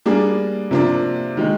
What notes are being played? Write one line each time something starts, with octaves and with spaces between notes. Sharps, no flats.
G3 A#3 D4 G#4
C3 F3 A#3 D4
D#3 G#3